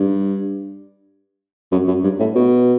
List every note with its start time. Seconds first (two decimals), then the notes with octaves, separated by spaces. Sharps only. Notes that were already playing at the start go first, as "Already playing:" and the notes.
Already playing: G2
1.72 F#2
1.88 F#2
2.03 G2
2.19 A2
2.35 B2